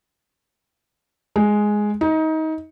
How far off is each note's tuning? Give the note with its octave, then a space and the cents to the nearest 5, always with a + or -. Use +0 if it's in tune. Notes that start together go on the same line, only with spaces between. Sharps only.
G#3 +5
D#4 +25